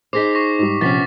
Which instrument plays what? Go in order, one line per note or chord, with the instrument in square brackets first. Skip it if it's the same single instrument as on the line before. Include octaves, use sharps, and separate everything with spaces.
[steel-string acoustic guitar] D#4 G#4 C5 [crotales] D6 A#6 B6
[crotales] C#6 A#6 C7
[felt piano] G#2 G3
[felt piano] A#1 C3 [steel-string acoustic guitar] B3 C#4 [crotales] A6 B6